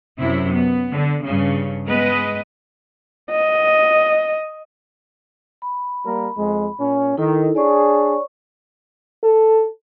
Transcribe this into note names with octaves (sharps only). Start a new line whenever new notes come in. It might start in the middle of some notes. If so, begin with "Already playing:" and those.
F#2 C3 E4
B3
D3
G2 C#3
G#3 B3 B4 D#5
D#5
B5
G3 A#3 A#4
F2 G#3
A#2 C#4
D#3 D#4 E4 A4
D4 G#4 C#5 D5 C#6
A4